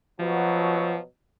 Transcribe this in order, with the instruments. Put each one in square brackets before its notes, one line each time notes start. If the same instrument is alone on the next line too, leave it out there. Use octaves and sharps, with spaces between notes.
[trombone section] B2 F#3 [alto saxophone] F3